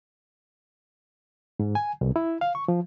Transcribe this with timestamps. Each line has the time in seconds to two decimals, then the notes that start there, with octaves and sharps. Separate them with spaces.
1.59 G#2
1.75 G#5
2.01 C2
2.16 E4
2.41 F5
2.55 C#6
2.68 F3